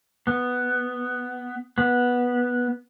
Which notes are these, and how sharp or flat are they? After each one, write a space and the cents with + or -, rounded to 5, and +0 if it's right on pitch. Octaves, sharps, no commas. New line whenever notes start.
B3 +5
B3 -10